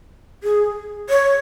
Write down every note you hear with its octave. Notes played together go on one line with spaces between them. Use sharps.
G#4
C#5